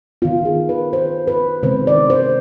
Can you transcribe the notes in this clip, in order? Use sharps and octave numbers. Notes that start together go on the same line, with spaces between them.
D#3 B3 F4
G#4
B4
C5
B4
C3 D#3 G#3 B3 C5
D5
C5